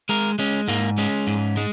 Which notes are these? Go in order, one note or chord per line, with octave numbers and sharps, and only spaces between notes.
G#3 A#4
G#3 C#4
G#2 A#3
G#3 C#4
G#2
G#3